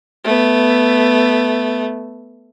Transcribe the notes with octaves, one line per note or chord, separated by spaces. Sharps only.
A3 B3